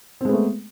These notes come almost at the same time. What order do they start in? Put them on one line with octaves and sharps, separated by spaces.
C4 G#3 B3 A3